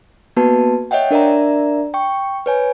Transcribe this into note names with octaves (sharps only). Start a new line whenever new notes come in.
A#3 B3 F#4 B4 A5
C#5 D#5 E5 F#5 G5
D4 A#4 D5 E5 A#5
G5 C#6
B4 C#5 G#5